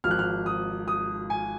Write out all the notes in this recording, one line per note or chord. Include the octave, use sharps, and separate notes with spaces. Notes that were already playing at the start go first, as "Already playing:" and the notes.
G#1 G#2 F3 F6
F#6
F6
D#6
D#6
G#5